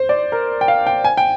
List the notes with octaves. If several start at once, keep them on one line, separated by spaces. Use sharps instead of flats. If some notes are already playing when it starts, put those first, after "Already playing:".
Already playing: C5
D5
A#4
G5
F5
G5
G#5
G5